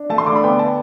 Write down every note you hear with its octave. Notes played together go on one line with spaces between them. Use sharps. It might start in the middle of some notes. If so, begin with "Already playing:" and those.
Already playing: D4
A3 A5
C6
D3 D6
B5
B3 G5
A5